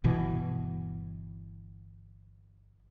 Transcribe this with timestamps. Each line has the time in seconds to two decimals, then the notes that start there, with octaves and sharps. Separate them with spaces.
0.04 G1 B2 E3